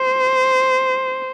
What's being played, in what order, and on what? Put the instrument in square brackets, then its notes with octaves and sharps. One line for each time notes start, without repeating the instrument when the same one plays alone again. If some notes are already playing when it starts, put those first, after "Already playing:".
Already playing: [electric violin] C5